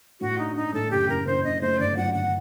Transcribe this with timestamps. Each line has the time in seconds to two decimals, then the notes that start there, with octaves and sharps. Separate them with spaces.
0.21 A2 F#4
0.39 D4 D#4
0.56 D4 D#4
0.73 A2 A4
0.91 F#1 G4
1.08 F#1 A#4
1.26 F#1 C5
1.44 F#1 D#5
1.61 A3 C5
1.79 G1 D5
1.97 F#3 F#5
2.14 G1 F#5